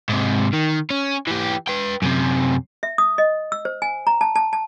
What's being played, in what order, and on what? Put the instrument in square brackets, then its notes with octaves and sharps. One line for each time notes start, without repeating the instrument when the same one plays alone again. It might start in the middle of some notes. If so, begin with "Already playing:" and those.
[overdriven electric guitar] G#2 C3
D#3
C#4
E3 G4
B4 G5
F#2 C3
[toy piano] E5
D#6
D#5
E6
C5
G#5
A#5
A5
A5
A5